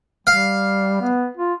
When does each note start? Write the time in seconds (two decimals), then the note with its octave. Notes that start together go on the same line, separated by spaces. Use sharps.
0.27 G3 F5
1.01 B3
1.37 F4